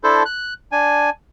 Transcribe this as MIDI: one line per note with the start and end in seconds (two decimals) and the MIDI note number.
0.04 0.23 62
0.04 0.23 64
0.04 0.23 69
0.04 0.23 72
0.25 0.54 90
0.72 1.10 62
0.72 1.10 80